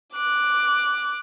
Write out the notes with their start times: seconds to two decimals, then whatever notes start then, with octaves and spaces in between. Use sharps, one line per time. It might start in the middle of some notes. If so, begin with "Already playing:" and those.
0.14 D6 F#6